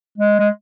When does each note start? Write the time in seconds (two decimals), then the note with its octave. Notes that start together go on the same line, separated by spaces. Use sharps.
0.18 G#3
0.40 G#3